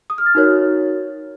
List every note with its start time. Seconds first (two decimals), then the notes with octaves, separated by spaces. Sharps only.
0.10 D#6
0.18 F6
0.26 A6
0.35 D#4 F#4 A#4 C#5